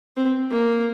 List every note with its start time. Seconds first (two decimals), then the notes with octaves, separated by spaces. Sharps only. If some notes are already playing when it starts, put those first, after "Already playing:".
0.17 C4
0.51 A#3